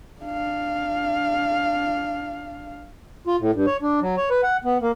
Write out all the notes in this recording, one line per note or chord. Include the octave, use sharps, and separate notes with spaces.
D4 F5
F4
A2
G2
C#5
D4
F#3
C#5
B4
F#5
B3
A#3